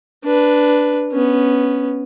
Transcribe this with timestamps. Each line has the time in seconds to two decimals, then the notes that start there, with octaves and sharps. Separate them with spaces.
0.24 D4 B4
1.12 B3 C#4